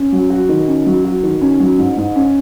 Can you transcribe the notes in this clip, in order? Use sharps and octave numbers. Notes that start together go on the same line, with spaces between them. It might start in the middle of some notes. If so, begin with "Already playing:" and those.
Already playing: C#4
F#3
F#4
D#3
C#4
F#3
F#4
D#3
C#4
F#3
G#2
G#2
C#4